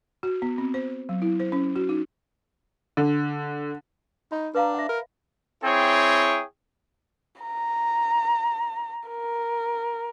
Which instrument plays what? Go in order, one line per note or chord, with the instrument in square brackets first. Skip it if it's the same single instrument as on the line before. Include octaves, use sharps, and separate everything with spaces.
[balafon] F#4
B3
C4
C5
F#3
E4
C5
C#4
F#4
D#4
[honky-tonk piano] D3
[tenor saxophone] D#4 [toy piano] B5 C#6
[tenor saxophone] D4 [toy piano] B4 F5 A#5
[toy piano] E5 F#5
[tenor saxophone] A#4 [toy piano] B5
[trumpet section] C4 E4 G#4 C#5 G5
[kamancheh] A#5
A#4